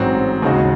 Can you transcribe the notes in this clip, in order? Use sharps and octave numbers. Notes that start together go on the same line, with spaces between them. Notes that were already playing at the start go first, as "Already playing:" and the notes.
Already playing: A1 G#2 F#3 C4 F#4
D#2 C#3 G#3 D#4 F#4